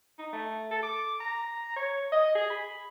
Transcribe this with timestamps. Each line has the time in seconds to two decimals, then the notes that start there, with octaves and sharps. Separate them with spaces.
0.18 D#4
0.33 A3
0.71 A4
0.83 D6
1.21 A#5
1.76 C#5
2.12 D#5
2.35 G#4
2.50 B5